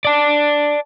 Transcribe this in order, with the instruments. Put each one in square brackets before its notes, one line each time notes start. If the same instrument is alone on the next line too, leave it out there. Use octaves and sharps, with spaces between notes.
[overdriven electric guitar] D5 A5